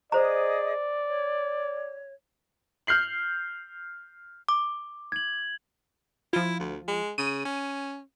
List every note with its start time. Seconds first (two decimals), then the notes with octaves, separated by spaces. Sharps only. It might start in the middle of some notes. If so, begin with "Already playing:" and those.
0.12 G#4 C5 D5 D#5 A#5
1.07 C#5
2.87 F6 G6 C7 F#7
4.49 D6
5.12 G#6 F#7
6.33 F3 E4 F4
6.60 D2
6.88 G#3
7.18 C#3 D#7
7.45 C#4